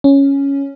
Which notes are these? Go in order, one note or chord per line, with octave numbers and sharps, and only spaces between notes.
C#4